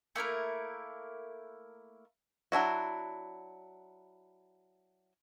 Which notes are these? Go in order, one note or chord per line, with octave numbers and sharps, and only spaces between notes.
A3 A#3 E4 A#4
F#3 D4 E4 F#4